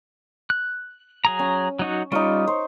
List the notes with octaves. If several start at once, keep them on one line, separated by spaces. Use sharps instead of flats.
F#6
F#3 G#4 A#5
C#4
F#3 D#4 F#4
G3 C#4 D#4 F4 C#5
C5